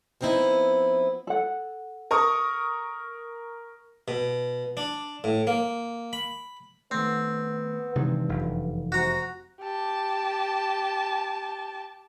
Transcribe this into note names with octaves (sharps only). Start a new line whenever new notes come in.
F3 B3 C4 D#4 E4
A4 F#5
A#4 C#6 D#6
B2
D4
A2
A#3
B5
D#3 A3 B3 C4
G2 C3 D#3 E3 G#3 D#4
F1 F#2
C3 F#4 A#5
G4 A5